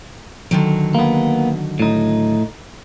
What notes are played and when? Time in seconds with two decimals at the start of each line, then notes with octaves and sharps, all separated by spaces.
0.51 D3 D#3 F#3
0.95 A#3 B3
1.80 A2 D#4